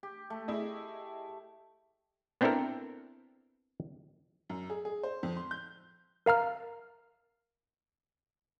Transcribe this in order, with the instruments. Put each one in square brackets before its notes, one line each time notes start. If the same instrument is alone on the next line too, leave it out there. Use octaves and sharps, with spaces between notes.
[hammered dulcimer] G4
A3
[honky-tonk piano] E4 G#4 D#5
[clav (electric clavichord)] B3 C4 D4 E4 A4 A#4
[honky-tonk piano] F#2
G#4
G#4
C5
F2
C6
G6
[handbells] A#4 F5 A#5 F6